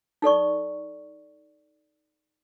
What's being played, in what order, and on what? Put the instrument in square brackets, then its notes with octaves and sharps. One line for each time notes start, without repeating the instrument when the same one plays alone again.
[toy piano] D#4 A4 D5 C#6